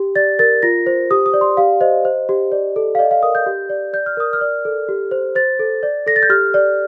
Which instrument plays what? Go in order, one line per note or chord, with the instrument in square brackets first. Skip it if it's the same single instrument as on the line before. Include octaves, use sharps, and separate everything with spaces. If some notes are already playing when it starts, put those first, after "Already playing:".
Already playing: [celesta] G4
D5 A6
A#4 A6
F4 A#6
C5
G4 D#6
D#6
D5
C6
G4 F5
C5 D#5
C5
G4
D5
A4
F5
D5 D#5
F5
A#4 D#6
G6
G4
D5
D5 G6
F6
A#4 D#6
F6
D5
A4
G4
C5
C5 A6
A4
D5
A4 A#6
A6
G6
G4 F6
D5